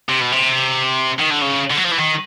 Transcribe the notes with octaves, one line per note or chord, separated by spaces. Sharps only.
C3
B2
C3
D#3
D3
C#3
D3
F#3
F3
E3
D#3